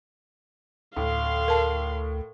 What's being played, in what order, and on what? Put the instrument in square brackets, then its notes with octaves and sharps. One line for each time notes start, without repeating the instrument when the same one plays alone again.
[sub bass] D2 [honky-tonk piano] A2 [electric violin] F5 C6
[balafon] A#4 A5